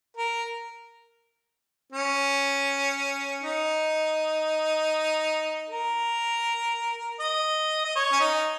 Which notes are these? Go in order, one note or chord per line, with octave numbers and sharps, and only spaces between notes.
A#4
C#4
D#4
A#4
D#5
D#5
C#5
C#4
D#4